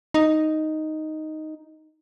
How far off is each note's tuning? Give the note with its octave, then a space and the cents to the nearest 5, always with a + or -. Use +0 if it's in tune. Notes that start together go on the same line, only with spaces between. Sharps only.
D#4 +0